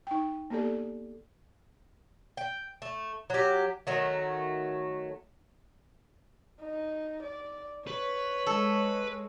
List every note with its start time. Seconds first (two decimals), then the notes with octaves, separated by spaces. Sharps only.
0.07 D#4 G5
0.50 A#3 B3 G4 A4 D5
2.37 G5
2.82 A3
3.30 F#3 G4
3.87 D#3 F#3 A3
6.60 D#4
7.23 D5
7.87 B4 C#5
8.46 G#3 A4